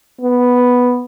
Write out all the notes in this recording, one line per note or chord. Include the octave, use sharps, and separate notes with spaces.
B3